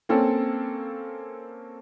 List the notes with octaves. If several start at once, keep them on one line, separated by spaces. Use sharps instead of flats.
A#3 C4 C#4 A4